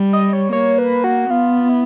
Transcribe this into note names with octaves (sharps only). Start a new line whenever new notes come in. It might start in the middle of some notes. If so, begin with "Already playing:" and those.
Already playing: G3
D#5
C#5
A#3 C#5
B4
F#4
B3 F4
E4